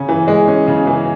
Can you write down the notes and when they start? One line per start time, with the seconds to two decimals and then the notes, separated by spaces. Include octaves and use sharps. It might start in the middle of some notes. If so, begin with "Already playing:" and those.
Already playing: C#3 C#4
0.09 E3
0.28 G#3
0.48 C#4
0.67 C#3
0.87 E3